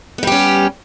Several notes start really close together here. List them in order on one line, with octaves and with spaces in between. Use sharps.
B3 G3 G4 C#4